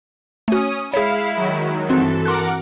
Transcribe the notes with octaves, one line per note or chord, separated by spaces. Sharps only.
A3 C#4 F#4 D#6 D#7
G#3 E4 G#4 C#5 F5
D#3 F#3
G2 E3 C4 F#4 A4
A#4 F#5 C6 D6 F#6